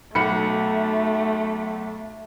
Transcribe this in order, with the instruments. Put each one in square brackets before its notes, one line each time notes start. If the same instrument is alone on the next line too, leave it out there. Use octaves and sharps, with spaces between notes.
[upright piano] B1 B5 C#7 [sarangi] A3